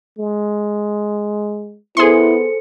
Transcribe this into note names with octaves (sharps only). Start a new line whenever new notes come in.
G#3
B3 E4 G#4 A4 C5 C6 C#7